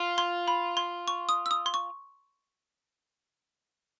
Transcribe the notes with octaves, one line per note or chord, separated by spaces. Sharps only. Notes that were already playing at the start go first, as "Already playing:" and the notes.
Already playing: F4
C6
B5
C6
C#6
D#6
E6
D#6
C6
C#6